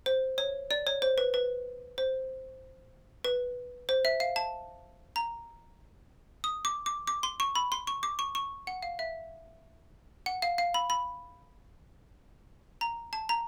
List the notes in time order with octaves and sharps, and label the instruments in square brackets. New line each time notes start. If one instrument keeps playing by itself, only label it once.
[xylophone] C5
C#5
D5
C#5
C5
B4
B4
C5
B4
C5
E5
F5
A5
A#5
D#6
D6
D6
D6
C6
C#6
B5
C6
C#6
D6
C#6
C#6
F#5
F5
E5
F#5
F5
F5
B5
B5
A#5
A5
A#5